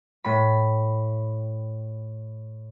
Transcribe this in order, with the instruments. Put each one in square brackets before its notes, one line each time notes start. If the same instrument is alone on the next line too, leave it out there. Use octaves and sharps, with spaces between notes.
[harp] A2 B5